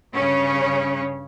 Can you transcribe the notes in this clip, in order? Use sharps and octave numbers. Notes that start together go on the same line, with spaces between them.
G2 C#3 C#4 C#5